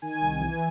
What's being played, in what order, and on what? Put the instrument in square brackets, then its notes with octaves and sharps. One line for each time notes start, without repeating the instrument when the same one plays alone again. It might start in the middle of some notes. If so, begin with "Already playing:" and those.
[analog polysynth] D#3 G#5
C2
E3